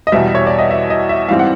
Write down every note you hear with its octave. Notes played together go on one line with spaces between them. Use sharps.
D#5
E2 B2 G3 E5
C#5
D5
D#5
E5
D#5
E5
G#2 E3 G3 C4 F5
F#5